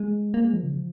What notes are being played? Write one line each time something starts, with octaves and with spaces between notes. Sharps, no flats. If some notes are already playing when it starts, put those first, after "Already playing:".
Already playing: G#3
A#3
G#3
F3
C#3
F3